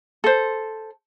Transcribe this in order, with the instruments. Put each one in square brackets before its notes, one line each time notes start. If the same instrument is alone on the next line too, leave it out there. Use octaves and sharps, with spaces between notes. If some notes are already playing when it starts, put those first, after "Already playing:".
[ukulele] A4 C5